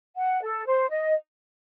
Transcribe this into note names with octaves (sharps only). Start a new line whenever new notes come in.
F#5
A4
C5
D#5